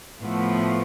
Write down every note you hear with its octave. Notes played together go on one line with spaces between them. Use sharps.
A2 F3 A3 B3